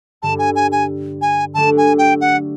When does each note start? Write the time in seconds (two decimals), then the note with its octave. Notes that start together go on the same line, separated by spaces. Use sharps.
0.22 G2 D3 G3 A5
0.39 G#5
0.56 G#5
0.72 G#5
1.22 G#5
1.54 D3 F#3 A3 D4 G4 A5
1.78 G#5
1.98 G5
2.21 F#5